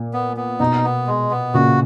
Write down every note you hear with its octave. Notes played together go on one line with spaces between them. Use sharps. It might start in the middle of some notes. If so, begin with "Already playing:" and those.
Already playing: A#2
B3
B3
B2 D#4
B3
G#3
B3
A#2 C#3 F#4